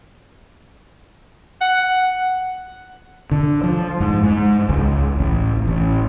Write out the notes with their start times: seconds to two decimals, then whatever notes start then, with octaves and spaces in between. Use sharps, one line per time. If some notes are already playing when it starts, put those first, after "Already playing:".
1.61 F#5
3.31 D3
3.64 F3
4.00 G#2
4.23 G#2
4.69 C#2
5.19 A1
5.67 A1